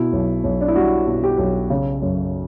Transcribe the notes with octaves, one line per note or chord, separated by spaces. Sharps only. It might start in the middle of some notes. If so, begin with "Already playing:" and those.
Already playing: B2 E4
B1
B1
D4
E4
G3 F#4
B2
G4
B1
C#3
F#2